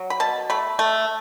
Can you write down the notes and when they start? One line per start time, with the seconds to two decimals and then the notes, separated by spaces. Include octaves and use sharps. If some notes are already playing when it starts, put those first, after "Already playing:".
Already playing: F#3
0.10 B5
0.20 B2 A5
0.50 A3 B5
0.79 A3